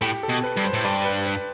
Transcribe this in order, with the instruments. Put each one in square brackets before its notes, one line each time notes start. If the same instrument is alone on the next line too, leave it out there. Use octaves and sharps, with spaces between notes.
[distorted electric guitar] A2 [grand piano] G4
[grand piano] A4
[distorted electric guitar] B2
[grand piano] B4
[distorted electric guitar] G2
[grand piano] C5
[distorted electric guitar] A2
[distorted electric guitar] G2 [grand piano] D5
[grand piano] B4
B4